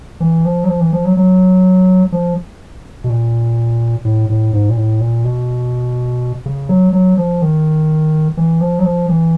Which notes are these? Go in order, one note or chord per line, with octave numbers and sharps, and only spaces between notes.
E3
F3
F#3
F3
E3
F3
F#3
F#3
F3
B2
A#2
A2
A2
G#2
A#2
A2
A#2
B2
C#3
F#3
F#3
F3
D#3
E3
F3
F#3
F3
E3